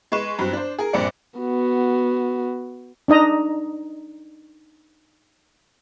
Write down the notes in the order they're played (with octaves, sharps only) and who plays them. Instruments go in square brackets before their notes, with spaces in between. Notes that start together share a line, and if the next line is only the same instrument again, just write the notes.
[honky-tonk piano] G#3 B4 C#6 E7
G2 F#3 C4
D4 C5
G#4 A#4
A#1 G2 C4 D5 C#7
[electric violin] B3 F#4
[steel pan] D4 D#4 D#5 A#5